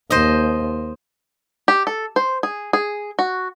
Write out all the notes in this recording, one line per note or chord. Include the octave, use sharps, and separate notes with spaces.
D#2 C5 D#5
G4
A4
C5
G#4
G#4
F#4